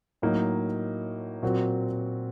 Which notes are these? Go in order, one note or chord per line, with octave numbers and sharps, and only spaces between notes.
A2 F#3 A#3 D#4
A#2 F#3 C4 F#4 A#4